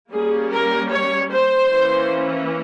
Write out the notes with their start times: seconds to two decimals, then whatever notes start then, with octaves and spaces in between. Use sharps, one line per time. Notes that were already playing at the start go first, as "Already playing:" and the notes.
0.13 G3 A#3 C#4 G#4
0.52 A#4
0.91 C#5
1.30 C5
1.69 E3 A#3 C#4